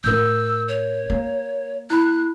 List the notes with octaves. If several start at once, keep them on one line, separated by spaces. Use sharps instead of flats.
A2 C4 A#4 E6 G6
C#5
A#3
E4 B5 F#6